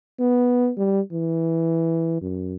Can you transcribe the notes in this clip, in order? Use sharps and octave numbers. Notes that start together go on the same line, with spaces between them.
B3
G3
E3
F#2